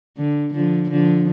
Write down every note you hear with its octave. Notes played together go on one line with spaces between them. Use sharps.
D3
D3 F3
D3 F3